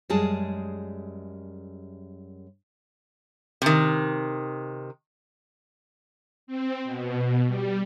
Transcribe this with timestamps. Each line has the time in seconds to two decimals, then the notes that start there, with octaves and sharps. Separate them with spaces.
0.09 F#2 G3 G#3 G#4 A5
3.62 C3 D#3
6.47 C4
6.85 B2
7.47 G3